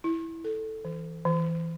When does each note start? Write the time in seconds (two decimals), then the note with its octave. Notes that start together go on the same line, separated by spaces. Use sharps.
0.04 E4
0.44 A4
0.85 E3
1.25 E3